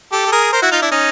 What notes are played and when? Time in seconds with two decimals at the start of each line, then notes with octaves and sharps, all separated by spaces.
0.12 G4 A4
0.26 A4
0.32 G#4 A#4
0.52 A#4 C5
0.62 E4 F#4
0.72 D#4 F4
0.82 D4 E4
0.92 C#4 D#4